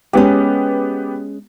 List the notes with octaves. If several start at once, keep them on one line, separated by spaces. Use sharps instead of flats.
G#3 B3 C#4 G4